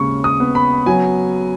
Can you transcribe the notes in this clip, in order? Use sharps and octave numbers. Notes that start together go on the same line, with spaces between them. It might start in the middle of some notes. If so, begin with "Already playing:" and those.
Already playing: D#2 C#3 G#3 C#6
D#6
B3
B5
F#3 G#5